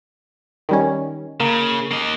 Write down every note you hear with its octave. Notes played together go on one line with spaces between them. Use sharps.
D#3 G3 C#4
C#3 A#3
A#3 D#5